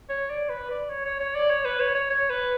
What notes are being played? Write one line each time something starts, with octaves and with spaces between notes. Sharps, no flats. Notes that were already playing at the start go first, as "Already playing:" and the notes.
C#5
D5
B4
D5
C#5
C#5
C#5
D5
C#5
B4
C#5
C#5
C#5
B4